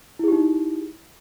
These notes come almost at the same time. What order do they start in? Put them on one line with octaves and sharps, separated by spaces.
E4 G#4 G4 D#4